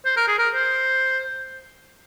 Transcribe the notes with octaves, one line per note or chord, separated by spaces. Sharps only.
C5
A#4
G#4
A#4
C5